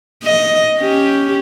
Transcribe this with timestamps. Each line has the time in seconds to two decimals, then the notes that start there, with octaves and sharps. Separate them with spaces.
0.23 D#5
0.79 C#4 G4